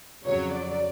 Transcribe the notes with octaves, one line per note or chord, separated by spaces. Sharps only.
F2 C#3 F#3 C#5
D5